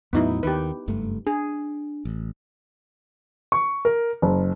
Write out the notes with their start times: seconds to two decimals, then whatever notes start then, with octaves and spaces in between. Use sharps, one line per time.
0.13 E2 A2 F#3 B3 D#4 E4
0.43 D#2 D#3 G4 B4
0.88 F#1 G2 A3
1.27 D4 G#4
2.05 A1
3.52 C#6
3.85 A#4
4.22 F#1